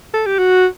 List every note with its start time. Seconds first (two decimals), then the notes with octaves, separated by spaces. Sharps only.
0.14 A4
0.26 G4
0.39 F#4